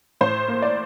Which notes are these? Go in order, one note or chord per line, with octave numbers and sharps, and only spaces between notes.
A2 C5
A#3
D5